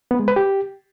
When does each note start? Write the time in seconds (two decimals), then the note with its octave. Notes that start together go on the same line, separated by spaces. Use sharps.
0.11 B3
0.19 G#3
0.28 B4
0.36 G4